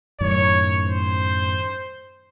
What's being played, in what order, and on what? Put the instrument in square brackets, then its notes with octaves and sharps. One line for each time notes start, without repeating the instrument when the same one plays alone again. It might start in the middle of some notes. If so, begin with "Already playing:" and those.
[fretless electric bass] F#2 A2 D#3 [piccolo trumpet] C#5
[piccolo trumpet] C5